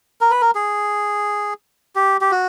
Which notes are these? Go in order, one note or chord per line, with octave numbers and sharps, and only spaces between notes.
A#4
B4
A#4
G#4
G4
G4
F#4